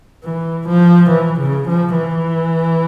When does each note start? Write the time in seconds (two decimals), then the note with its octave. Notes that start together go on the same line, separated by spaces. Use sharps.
0.24 E3
0.68 F3
1.10 E3
1.40 C#3
1.68 F3
1.97 E3